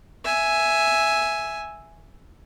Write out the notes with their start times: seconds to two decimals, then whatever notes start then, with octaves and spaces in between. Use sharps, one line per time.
0.24 E5 G#5